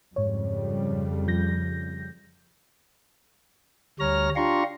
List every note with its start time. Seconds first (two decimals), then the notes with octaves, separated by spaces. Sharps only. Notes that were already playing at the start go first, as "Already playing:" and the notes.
0.16 F2 G#2 C#3 G3 C#5
1.27 F3 G6 A#6
4.00 D2 G3 C#5 A#5 F6 A#6
4.36 D4 F4 G4 A#5 C6 C#6